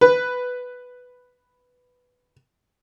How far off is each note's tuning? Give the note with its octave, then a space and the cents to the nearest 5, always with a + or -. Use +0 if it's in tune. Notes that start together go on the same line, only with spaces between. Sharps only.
B4 +5